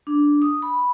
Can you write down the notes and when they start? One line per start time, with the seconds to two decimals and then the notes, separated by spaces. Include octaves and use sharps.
0.07 D4
0.42 D#6
0.62 B5